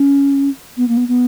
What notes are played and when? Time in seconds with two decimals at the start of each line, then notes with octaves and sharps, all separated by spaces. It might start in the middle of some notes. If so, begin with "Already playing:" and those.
Already playing: C#4
0.77 B3
0.88 A#3
0.97 B3
1.08 B3